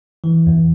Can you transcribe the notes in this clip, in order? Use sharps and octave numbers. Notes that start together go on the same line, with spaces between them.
E3
E2